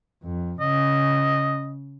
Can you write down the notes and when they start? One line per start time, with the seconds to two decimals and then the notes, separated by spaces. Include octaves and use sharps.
0.23 F2
0.60 C#3 D#5